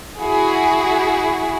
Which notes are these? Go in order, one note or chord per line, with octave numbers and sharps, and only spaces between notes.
E4 F#4 G#4